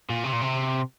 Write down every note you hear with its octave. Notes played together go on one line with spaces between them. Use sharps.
A#2
C3
A#2
C3